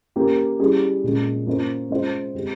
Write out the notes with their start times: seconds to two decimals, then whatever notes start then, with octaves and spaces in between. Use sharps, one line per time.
0.16 A#3 C#4 G4 A#4
0.59 G3 C#4 E4 G#4
1.04 A#2 G#3 C#4
1.46 A#3 C#4 F4 C5
1.90 G#3 C#4 F4 C5
2.35 G#3 C4 G4